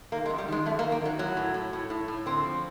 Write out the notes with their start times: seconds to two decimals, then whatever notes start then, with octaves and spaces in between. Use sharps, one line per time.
0.12 D#3 A#3
0.26 G#3
0.30 F#2
0.38 G3
0.48 D#3 G#3
0.65 F#2 A3
0.79 A#3
0.84 D#3
0.92 A#3
1.01 D#3 F#3
1.19 A2 F#3
1.37 A2
1.54 A2
1.73 A2
1.90 A2
2.08 A2
2.26 D3 C4
2.44 F3